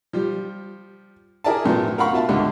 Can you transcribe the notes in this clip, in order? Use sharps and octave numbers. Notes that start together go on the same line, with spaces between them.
F3 G3
E4 G#4 A#4 D5 E5 A5
F#2 A2 F3 B3
A#4 F5 F#5 B5 C#6
B2 F4 E5 A5
C#2 G#2 D3